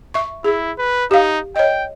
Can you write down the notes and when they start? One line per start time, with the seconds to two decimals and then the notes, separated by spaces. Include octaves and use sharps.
0.14 E5 C#6
0.44 E4 G#4
0.78 B4
1.11 D#4 G4 F5
1.56 C#5 D#5 G5